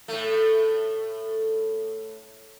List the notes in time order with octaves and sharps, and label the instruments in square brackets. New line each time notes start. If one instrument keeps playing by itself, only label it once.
[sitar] A2 A3